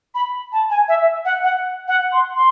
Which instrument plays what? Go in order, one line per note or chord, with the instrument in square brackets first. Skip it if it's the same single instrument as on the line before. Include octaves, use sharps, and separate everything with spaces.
[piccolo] B5
A5
G#5
E5
F#5
F#5
F#5
C6
C6